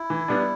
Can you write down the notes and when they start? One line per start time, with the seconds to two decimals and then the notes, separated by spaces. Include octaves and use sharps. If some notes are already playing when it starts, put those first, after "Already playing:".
Already playing: E4
0.10 E3
0.28 G3 B3 D4